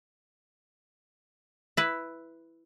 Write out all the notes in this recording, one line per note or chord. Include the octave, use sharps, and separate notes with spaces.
E4 B4